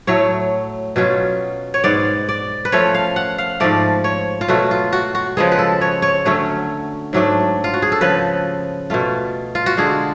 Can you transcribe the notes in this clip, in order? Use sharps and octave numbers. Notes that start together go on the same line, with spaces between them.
A2 F#3 A3 C#5
B2 F#3 C#4 F4
C#5
G#2 G#3 B3 D5
D5
B4
F3 A3 C#4 F4 C#5
F5
F#5
F5
G#2 F3 A3 D5
C#5
F4
B2 F#3 A3 F#4
F4
F#4
F#4
C#3 F3 G#3 B3 G#4
B4
A4
C#5
C#5
D3 F#3 A3 C#4
G#2 F#3 A3 D4
F4
F#4
G#4
A4
C#3 F3 B3 B4
B2 A3 F4
F4
F#4
D3 G#3 D4 F4 G#4